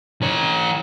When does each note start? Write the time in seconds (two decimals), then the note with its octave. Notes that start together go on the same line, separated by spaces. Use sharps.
0.22 E3 C#5